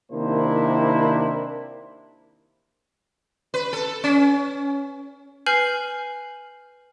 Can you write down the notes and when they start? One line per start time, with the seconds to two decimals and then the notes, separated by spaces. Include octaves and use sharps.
0.12 C3 D#3 A#3 D4 E4 C5
3.54 B4
3.73 A4
4.04 C#4
5.46 B4 G#5 F6 G6 C7 F#7